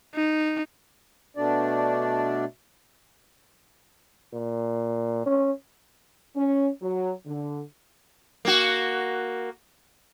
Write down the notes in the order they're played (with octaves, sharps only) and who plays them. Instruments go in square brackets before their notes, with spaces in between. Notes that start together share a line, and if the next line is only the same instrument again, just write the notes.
[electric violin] D#4
[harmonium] B2 A3 D4 D5
[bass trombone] A#2
C#4
[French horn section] C#4
F#3
D3
[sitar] A#3 F#4